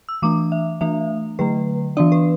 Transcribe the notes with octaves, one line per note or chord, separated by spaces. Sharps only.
E6
E3 A3 D4 D6
E5
E3 A3 D4 E5
D3 F#3 A3 B4
E3 B3 D4 D5
B4